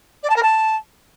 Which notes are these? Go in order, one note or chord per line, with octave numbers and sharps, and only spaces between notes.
D5
A5
A#4
A5